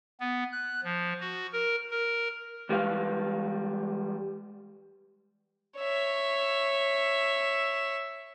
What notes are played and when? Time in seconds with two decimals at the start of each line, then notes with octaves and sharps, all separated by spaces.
0.20 B3
0.52 F#6
0.84 F3
1.20 F#4
1.53 A#4
1.91 A#4
2.69 E3 G3 G#3 B4 F5
5.78 C#5 E5